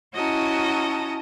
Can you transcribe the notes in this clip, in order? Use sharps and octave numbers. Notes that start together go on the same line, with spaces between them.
C#4 E4 F#4 D#5 A5 A#5